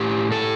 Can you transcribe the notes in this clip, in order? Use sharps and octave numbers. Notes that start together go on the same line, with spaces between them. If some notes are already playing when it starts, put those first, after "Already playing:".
Already playing: A2 G4
A4